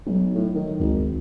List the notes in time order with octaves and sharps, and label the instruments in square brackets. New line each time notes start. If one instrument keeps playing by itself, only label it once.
[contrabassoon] B1 [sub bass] F#3
[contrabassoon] A2
D#3
[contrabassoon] G#1 [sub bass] C#2